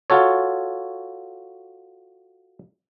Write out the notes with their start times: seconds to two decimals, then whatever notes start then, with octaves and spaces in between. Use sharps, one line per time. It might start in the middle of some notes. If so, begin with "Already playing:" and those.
0.10 F4 F#4 A4 C#5